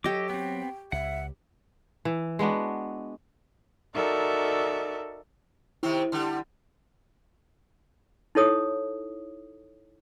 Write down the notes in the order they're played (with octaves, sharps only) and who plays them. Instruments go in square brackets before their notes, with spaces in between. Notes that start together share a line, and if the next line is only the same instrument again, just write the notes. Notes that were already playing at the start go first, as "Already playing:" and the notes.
[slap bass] F#3 [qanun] G4 C#5 [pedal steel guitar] A4 D#5 D6
[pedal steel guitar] B3 C4 [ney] G5
[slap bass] C#2 [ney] E5 [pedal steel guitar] F#5
[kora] E3
G#3 B3 D4 F#4
[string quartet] D#4 F#4 A4 A#4 D5 E5
[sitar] C3 D#3 C4 [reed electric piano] E4
[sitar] D3 G3
[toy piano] D#4 E4 A4 C#5 D#6